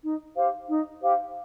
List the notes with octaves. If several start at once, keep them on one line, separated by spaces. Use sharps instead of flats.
D#4
G4 C5 F5
D#4
G4 C5 F5